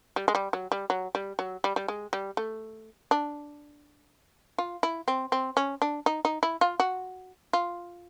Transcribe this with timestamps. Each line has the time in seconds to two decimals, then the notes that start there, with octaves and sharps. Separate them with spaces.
0.16 G3
0.28 G#3
0.35 G3
0.53 F#3
0.72 G3
0.90 F#3
1.15 G3
1.39 F#3
1.64 G3
1.76 G3
1.88 G#3
2.13 G3
2.37 A3
3.11 D4
4.58 F4
4.83 E4
5.08 C4
5.32 C4
5.57 C#4
5.82 D4
6.06 D#4
6.25 D#4
6.43 E4
6.61 F4
6.80 F#4
7.53 F4